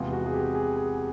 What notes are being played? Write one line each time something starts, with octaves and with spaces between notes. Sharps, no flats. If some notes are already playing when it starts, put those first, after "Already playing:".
Already playing: E2 C3 F3 G#3 F4
F#4
G#4
G4
G#4
G#4